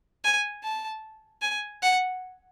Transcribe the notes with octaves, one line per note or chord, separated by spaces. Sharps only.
G#5
A5
G#5
F#5